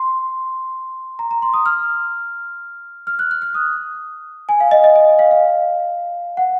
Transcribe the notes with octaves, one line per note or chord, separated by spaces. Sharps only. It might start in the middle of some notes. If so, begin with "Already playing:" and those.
Already playing: C6
A#5
A#5
C6
D#6
F6
F6
F#6
F#6
F6
D#6
G#5
F5
D#5
D#5
D#5
F5
F5
F#5